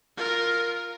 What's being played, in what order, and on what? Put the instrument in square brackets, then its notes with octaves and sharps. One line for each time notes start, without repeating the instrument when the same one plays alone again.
[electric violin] F4 A#4